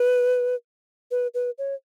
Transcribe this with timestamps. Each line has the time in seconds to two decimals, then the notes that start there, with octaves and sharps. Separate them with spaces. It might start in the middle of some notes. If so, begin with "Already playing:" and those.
Already playing: B4
1.11 B4
1.34 B4
1.58 C#5